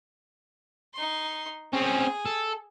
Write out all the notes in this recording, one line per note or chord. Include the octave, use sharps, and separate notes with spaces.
D#4 C6
C4 C#4 G#4
A4